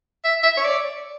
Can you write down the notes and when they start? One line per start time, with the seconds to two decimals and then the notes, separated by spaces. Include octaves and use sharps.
0.24 E5
0.43 E5
0.57 C#5
0.64 D5